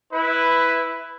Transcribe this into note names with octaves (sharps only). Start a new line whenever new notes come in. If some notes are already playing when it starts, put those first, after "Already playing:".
E4 B4